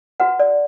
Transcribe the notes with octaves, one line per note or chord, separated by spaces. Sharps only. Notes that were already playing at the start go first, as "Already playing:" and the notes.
F#4 B4 F#5
D5